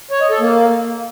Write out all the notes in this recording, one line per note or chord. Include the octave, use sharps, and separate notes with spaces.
C#5
D#5
A4
A#3